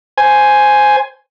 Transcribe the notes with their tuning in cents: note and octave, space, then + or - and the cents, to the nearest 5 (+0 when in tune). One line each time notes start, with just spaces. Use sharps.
C5 +0 G#5 +5